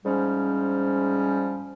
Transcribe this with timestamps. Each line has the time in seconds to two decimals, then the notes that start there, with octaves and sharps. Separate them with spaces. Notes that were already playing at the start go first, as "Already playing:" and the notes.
0.05 G#2 F3 G3 C#4